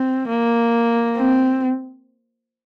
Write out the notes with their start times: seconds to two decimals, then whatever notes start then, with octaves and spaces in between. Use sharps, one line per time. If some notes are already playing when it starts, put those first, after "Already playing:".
Already playing: C4
0.29 A#3
1.17 C4